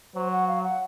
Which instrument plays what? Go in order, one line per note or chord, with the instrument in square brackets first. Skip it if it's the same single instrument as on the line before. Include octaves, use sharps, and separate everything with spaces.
[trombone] F#3 [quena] C5
[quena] F#5
F5
F#5